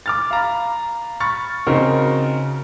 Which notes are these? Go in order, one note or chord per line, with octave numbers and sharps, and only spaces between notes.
D6 F6 A6
F5 A#5 B5
B5 C#6 F6 A6
C#3 C4 D#4 F#4 A#4